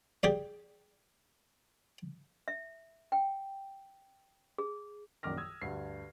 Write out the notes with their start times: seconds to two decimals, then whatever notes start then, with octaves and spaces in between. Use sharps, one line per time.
0.23 G4 G#4 D5
2.48 E5
3.12 G5
4.58 G#4
5.23 A#1 F#2 D#3 D6 F6 A#6
5.37 D#6 E6 G#6
5.62 D2 G2 C7